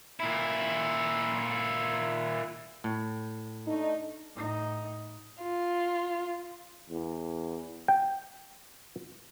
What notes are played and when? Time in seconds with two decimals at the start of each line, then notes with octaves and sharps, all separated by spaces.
0.20 A#2 E4
2.84 A2
3.67 A3 D4 D#4
4.35 A2 D#4
5.42 F4
6.89 E2
7.88 G5